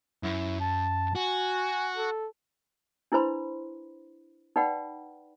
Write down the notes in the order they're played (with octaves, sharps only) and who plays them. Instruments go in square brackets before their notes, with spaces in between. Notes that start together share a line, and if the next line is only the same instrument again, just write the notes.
[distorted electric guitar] F#2 [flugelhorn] E4
[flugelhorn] A5
[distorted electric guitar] F#4 [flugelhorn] G#5
[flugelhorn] A4
[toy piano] D4 E4 B4 C5 B5 C6
D#4 B4 D5 F#5 G5 B5